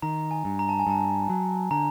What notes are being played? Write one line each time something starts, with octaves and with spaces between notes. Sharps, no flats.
D#3 A#5
G#5
G2
A#5
A5
G#5
G2 A5
F#3
D3 A#5